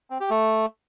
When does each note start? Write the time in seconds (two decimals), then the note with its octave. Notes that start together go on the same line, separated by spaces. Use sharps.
0.10 C4
0.20 G4
0.30 A3